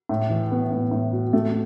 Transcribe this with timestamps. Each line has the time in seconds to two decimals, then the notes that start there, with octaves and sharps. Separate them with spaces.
0.09 A2
0.30 E3
0.51 B3
0.72 A2
0.91 A2
1.12 F#4
1.33 A3